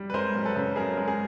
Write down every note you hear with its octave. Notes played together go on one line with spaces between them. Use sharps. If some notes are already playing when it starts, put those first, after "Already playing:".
Already playing: G3
B4
G#3 A#4 C5
F#2
A4 B4
C#3
F#2 G#4 A#4
G#3
G#4 A#4